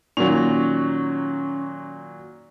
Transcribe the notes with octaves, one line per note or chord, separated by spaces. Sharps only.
A#2 D#3 F#3 C#4